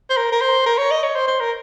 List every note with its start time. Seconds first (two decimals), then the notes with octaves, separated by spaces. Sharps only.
0.10 C5
0.17 A#4
0.32 A#4
0.41 C5
0.66 A#4
0.78 C#5
0.91 D#5
1.03 C#5
1.15 C5
1.27 C5
1.41 A#4